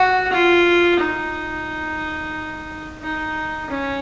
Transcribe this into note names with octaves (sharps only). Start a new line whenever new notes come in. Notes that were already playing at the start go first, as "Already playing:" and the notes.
Already playing: F#4
F4
D#4
D#4
C#4